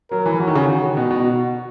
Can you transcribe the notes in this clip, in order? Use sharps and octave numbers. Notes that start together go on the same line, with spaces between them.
F#3 A#4
E3
E3 F#4
D#3
C#3
D#3
B2 F#4
B2
F#4